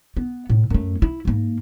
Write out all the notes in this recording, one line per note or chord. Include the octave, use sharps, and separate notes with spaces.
B3
A2
F#2 A3
E4
G#2 A#3